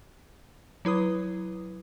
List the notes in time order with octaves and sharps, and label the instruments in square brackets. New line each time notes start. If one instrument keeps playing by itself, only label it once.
[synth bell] F#3 E4 B4 D#6